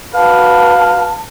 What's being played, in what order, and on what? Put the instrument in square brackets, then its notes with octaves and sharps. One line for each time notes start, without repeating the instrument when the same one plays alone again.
[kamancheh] F#4 B4 [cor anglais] F5 [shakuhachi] A5